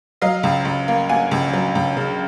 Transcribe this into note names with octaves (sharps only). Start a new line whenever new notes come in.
F#3 D#5 F5
C#2
C#2
A#3
A#3 F#5 G#5
C#2
F#3
C#2
C#3